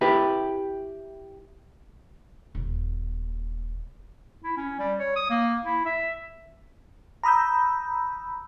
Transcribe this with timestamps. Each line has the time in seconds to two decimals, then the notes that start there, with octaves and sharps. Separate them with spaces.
0.01 E4 G4 B4
2.55 D#1
4.44 E4
4.57 C#4
4.79 G3
4.99 C#5
5.16 D#6
5.30 A#3
5.65 E4
5.85 E5
7.24 A#5 B5 D#6 E6 G6